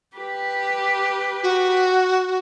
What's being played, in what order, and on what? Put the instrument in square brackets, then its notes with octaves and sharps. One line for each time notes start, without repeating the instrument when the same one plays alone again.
[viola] G4 B4
[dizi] F#4